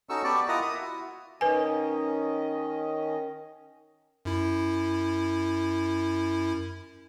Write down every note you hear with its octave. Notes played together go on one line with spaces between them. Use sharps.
C#4 D#4 F#4 A4 C#6 E6
B3 G4 D5 A5 C#6
E4 F4 A#4 D#5 F#5 A#5
E5 D#6
E4 F#4
D#3 C#4 B4 D#5 G#5
F#2 E4